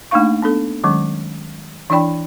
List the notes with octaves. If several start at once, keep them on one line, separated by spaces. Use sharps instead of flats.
A3 A#3 D4 D#4 F5 C#6
B3 D4 A4
D#3 F#3 G#3 C#4
E3 D4 E4 D5 G5 B5